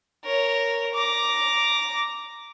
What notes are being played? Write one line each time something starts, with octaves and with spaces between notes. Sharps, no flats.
A#4 C#5
A#5 D6